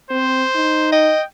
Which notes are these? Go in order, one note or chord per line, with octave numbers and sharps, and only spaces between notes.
C4 C5
D#4
D#5 G5